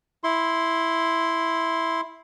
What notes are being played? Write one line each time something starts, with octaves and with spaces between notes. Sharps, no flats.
E4 C6